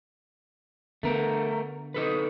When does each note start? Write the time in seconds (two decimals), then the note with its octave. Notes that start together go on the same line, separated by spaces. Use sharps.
1.03 D3 A3 B3 A#4
1.94 D#4 A4 B4